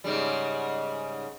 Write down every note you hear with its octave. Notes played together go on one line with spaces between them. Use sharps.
G#2 C#3 G3